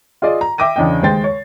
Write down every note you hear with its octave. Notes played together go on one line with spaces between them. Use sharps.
F4 G#4 D5 D#5
A#5
E5 G5 D6 A#6 D#7
E2 C#3 D4 D#5 G5
D#2 G#3 C5 G5 A6 C7
C#5